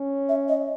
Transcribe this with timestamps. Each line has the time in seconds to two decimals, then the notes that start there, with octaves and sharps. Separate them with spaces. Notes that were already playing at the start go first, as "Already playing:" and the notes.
Already playing: C#4
0.29 E5
0.48 D#5